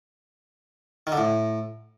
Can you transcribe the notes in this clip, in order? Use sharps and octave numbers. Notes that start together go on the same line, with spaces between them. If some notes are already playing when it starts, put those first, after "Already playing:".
D#3
D3
A2